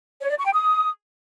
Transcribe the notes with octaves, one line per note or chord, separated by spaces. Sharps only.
C#5
D5
C#6
G5
D#6